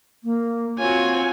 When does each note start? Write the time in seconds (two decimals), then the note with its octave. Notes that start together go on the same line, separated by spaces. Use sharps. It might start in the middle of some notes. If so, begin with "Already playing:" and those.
0.24 A#3
0.79 C4 F4 F#4 C#5 G#5